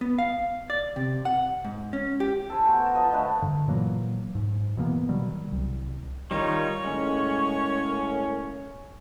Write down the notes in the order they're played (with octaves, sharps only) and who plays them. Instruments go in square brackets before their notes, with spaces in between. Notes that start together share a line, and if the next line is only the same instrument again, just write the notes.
[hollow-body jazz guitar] B3
F5
D5
C3
F#5
G#2
C#4
G4
[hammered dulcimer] A4 C5 G#5
B3 F#4 G5
A5 A#5
F3 D#5
D3 A3 B4
[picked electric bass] G2 D3
A#2 E3 F#3 A#3
G#2
B2 E3 A#3 B3
B2 D#3 F#3 G3
C2
[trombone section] D#3 [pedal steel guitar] G3 D#4 F4 [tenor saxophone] C#5
[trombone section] A2 A#3 C#4 [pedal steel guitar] G#3